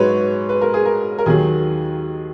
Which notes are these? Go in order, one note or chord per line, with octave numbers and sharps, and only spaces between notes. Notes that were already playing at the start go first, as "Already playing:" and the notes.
Already playing: G#2 F#3 B4 C#5
B4
A#4
G#4
A#4
A#4
D#2 D#3 F#3 G#4